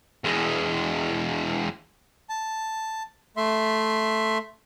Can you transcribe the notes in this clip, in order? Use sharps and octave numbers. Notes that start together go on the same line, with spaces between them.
E2 G#3
A5
A3 E5 C6